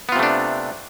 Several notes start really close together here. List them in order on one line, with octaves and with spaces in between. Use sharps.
B3 F4 C3 A3 D4